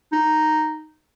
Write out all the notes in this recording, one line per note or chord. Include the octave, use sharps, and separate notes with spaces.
D#4